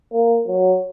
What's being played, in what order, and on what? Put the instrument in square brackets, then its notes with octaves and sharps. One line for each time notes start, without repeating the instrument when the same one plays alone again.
[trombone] A#3
F#3